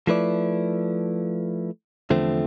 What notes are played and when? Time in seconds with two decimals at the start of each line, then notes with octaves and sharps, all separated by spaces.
0.07 F3 A3 E4 B4 D5
2.10 E2 D3 F3 A3 C4